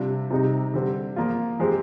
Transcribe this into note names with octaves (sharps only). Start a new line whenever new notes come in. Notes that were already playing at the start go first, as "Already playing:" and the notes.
Already playing: C3 G3 D4 F4
C3 G3 C4 D#4
D3 G3 C4
F3 A#3 F4
F3 G#3 C4 G4